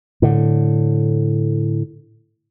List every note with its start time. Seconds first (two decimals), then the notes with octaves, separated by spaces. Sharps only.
0.22 A2 D3